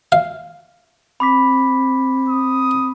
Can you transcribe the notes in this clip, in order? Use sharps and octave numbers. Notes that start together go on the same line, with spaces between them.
F5
C4 B5 D6 B6
D#6